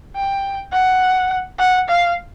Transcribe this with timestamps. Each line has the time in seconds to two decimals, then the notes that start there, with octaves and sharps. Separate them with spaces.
0.16 G5
0.72 F#5
1.59 F#5
1.88 F5